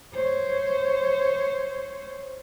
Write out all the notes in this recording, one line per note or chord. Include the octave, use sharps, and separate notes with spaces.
C5 C#5